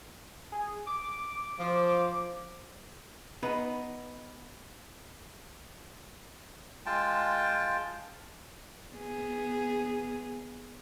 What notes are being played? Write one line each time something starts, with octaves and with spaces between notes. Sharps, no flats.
G#4
D6
F3
B3 D#4 B4
G#3 F4 G5 A5
B3 G#4